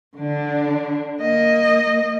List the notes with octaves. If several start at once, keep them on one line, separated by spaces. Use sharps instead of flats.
D3 D4
A#3 D#5